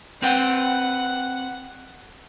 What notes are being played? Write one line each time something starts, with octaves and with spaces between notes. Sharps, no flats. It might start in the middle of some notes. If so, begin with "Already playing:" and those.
C4 B4 F#5 G5